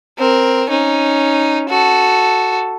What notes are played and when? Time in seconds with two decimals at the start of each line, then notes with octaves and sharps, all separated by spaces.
0.18 C4 A#4
0.70 C#4 D#4
1.69 F#4 A4